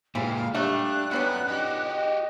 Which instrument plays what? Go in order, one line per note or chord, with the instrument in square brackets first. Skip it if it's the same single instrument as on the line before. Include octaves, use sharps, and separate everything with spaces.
[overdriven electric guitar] A#2 G#3 [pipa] E3 G3 B5 [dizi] F5
[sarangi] G3 [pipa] A3 A#3 F#4 [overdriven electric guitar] D4 [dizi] F#6
[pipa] D3 F#3 G3 [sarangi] B3 [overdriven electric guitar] C#4 F#4
[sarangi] D#4 [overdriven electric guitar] F#4 G4
[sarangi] D#5